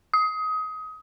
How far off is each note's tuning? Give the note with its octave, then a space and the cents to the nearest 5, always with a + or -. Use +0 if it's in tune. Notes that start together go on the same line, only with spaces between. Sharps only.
D#6 +25